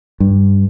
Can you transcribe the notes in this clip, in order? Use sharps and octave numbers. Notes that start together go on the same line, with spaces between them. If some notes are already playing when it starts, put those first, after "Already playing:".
G2